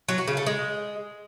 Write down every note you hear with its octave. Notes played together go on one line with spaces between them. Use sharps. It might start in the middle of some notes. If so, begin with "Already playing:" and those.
F#3
F#4
C#3
A3
G#3